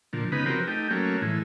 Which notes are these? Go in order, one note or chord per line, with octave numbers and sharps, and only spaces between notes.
A#2 D3 F3
C#3 G#3 B3 D#4 B4
F3 C4 F#4 G4 A#4 B4
A3 D#4 G4 G5
F#3 A3 A#3 C#4
A2 E3 G#3